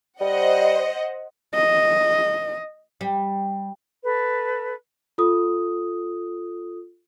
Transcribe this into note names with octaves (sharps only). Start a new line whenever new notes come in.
G3 C5 D#5 F#5
D#5
G3
A4 B4
F4 A4 D#6